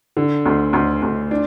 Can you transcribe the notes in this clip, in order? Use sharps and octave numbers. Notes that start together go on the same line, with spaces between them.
D3
D2
D2
D2
D4